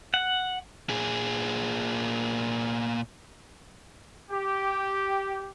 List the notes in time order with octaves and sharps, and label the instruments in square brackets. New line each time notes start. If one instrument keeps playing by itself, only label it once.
[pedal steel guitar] F#5
[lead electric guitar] A#2 G#4
[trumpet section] G4